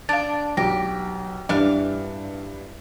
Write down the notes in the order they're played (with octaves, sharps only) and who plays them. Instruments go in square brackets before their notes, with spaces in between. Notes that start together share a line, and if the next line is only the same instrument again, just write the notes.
[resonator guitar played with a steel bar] D4 [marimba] F5 A6
[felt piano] B1 [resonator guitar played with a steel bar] G4 [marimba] A#6
[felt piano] G2 [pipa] E3 D4 F5